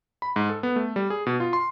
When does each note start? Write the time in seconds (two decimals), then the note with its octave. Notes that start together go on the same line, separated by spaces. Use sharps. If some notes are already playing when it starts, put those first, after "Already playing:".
0.22 B5
0.36 G#2
0.49 A4
0.63 B3
0.76 A3
0.96 G3
1.10 G#4
1.26 B2
1.40 F4
1.53 C6